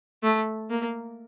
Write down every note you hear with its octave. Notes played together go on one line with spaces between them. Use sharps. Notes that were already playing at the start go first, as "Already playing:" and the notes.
A3
A#3